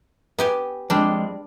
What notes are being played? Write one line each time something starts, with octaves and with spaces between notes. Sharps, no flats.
B3 G4 G#5
F2 G3 G#3 D4